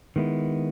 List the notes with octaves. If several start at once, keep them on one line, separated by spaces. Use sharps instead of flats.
D#3 G#3 B3 E4